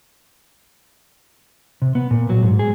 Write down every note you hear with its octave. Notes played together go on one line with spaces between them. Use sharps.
C3
B3
A#2
F#3
G#2
G#4